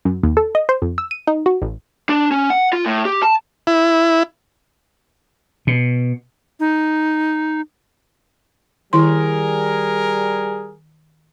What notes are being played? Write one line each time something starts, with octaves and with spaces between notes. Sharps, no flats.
F#2
D#2
A4
D#5
C5
F2
E6
D#7
D#4
F#4
A1
D4
C#4
F#5
F4
A2
G4
A5
E4
B2
D#4
D#3 G3 E4 G#4 A#4 C6